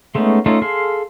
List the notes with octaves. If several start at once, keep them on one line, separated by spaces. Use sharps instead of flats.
G#3 A3 B3 C#4 D#4
A3 C#4 D#4 F4 A4
G#4 A4 F5 C6